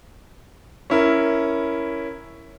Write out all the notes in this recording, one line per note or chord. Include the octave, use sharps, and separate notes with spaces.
C#4 E4 A#4